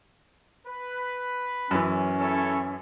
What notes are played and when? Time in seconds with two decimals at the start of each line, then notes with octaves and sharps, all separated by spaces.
0.67 B4
1.71 F#2 E3 C#4
2.20 E4 A4 C#5